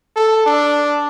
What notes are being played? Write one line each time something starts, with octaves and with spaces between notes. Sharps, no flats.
A4
D4